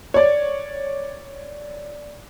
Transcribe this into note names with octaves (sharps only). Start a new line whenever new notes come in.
C#5 D5